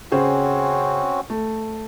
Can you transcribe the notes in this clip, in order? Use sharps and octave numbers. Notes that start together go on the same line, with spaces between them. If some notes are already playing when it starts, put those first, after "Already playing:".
C#3 C4 C#4 F#4 G#4 C5
A3